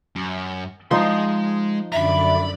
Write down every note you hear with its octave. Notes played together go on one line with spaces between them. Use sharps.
F#2
F3 G#3 D#4 C6
F#2 D3 D5 E5 A#5 B5